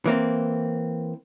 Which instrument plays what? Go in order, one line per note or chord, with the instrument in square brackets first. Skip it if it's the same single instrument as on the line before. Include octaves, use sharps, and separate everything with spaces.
[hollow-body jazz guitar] E3 A#3 C4